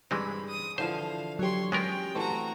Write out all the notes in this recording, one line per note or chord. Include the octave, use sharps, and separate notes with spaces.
G2 E3 G#3 C4 G#4 B5
D#6
D3 E3 F3 C5 F5
F#3 G4 C#5 C6
G#3 B3 C#4 A#4 G5
E3 A3 C4 F#4 A#5